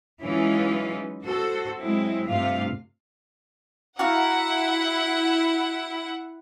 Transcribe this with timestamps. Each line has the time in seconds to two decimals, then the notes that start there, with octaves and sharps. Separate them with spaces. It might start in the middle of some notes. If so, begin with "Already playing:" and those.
0.21 E3 F#3 G#3 C#4 D#4 F4
1.25 F#4 A4 C5
1.79 F#3 G#3 C4 E4
2.28 G2 C3 A3 F4 F5
3.99 E4 F#4 F5 F#5 A#5